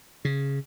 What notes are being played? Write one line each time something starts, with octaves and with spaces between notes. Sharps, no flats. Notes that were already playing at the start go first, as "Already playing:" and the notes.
C#3